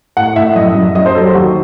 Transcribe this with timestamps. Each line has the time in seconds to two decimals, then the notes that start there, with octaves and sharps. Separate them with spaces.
0.17 A2 F#5
0.36 A2 E5
0.56 F#2 D#5
0.75 F#2
0.95 F#3 D#5
1.06 C5
1.15 F#3 A4
1.25 G4
1.35 D#2 F#4